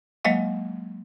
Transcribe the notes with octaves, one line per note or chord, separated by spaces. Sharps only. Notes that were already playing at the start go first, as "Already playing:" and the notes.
F#3 G#3 A#3 D#5 F5